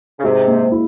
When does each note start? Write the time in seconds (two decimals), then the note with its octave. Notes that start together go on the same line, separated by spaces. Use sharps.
0.19 C#3
0.23 G#2 C3 G#3
0.48 A#2
0.72 E4